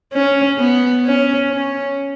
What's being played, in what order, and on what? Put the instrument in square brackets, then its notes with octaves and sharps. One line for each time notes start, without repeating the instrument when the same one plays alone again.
[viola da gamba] C#4
B3
C#4
C#4